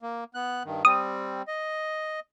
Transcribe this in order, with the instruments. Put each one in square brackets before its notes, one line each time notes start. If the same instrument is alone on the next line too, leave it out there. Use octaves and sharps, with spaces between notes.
[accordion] A#3
B3 F#6
G2 D#3
[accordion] G3 C4 [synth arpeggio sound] D#6
[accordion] D#5